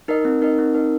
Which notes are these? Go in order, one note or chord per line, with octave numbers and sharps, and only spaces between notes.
D#4 A#4 D#5
C4
D#4 A#4 D#5
C4
D#4 A#4 D#5